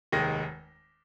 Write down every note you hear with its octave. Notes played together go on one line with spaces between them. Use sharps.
F1 D#2 D#3 G#3 A#6